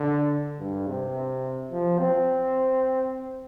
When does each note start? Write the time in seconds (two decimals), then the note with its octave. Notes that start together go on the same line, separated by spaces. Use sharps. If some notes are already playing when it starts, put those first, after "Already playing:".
Already playing: D3
0.59 G2
0.87 C3
1.71 F3
1.99 C4